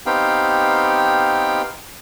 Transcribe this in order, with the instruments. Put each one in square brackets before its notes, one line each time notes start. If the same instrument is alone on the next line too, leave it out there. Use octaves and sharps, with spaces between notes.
[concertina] B3 C4 D#4 G4 F5 G5